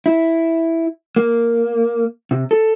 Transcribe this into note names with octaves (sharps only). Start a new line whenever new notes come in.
E4
A#3
C3
A4